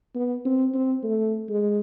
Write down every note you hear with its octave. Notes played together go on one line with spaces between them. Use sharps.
B3
C4
C4
A3
G#3